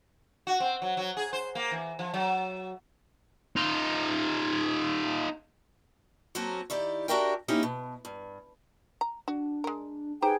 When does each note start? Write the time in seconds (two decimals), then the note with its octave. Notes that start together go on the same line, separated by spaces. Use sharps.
0.47 F#4
0.60 C4
0.82 F#3
0.97 F#3
1.17 G#4
1.33 C5
1.55 A#3
1.71 E3
1.99 F3
2.14 F#3
3.56 D#4 F4
6.35 F#3 A#3 C4 C#4 F#4 A4
6.70 D#3 E4 G4 D5
7.08 D4 F#4 G4 A#4 E5 G5
7.48 A#3 C#4 D#4 E4 G4
7.63 B2
8.05 G2
9.01 A#5
9.28 D4 F#4
9.64 G#3 A#4
10.22 D#4 G4 G#4 B4 C5 G5 A#5